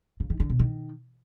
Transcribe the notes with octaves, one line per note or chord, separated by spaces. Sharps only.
C#3
D#3
D3
B2
D#3